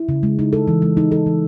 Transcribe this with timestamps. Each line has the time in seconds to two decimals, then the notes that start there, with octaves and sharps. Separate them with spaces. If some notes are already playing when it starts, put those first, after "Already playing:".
Already playing: E4
0.09 C#3
0.23 G#3
0.39 D#4
0.53 A4
0.68 E3
0.82 G#3
0.97 D#4
1.12 A4
1.26 E3